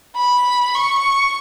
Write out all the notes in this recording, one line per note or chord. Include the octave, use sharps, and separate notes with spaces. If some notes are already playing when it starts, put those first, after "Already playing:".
B5
C#6